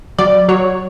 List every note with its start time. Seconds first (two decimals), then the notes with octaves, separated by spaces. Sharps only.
0.19 F#3 D5
0.48 F#3 C#5